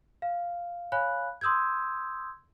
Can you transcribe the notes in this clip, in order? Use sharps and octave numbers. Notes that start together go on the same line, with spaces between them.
F5
C#5 F5 G#5 B5 F#6
C6 D#6 E6 G6 G#6